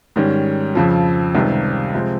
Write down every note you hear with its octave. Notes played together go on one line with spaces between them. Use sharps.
G#2 D#3 G3 C#4
F2 C#3 F3
C#2 C3 D#3 G3
C3 F3 G#3 C4